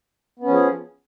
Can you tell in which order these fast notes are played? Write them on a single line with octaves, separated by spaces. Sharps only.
B3 C#4 F3 G#4